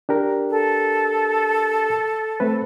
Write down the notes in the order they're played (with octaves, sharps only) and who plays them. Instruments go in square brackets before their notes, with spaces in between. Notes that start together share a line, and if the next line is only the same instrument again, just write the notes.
[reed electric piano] D4 G4 A#4
[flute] A4
[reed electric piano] A3 C4 B4